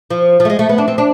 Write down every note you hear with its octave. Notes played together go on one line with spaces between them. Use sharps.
F3
F3
A3
G#3
A3
B3
D4
C4
D4